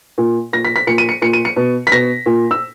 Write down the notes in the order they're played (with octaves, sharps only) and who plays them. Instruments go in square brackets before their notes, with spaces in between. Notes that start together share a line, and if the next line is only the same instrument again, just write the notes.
[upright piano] A#2
A#2 A#6
B6
B6
A#2 C#7
D#7
C#7
A#2 C#7
D#7
C#7
B2
B6
B2 A#6
A#2
E6